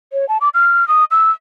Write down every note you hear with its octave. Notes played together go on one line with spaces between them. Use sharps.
C#5
A5
D6
F6
D#6
E6